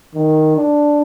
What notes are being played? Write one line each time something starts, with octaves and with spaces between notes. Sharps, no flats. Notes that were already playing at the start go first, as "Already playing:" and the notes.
D#3
D4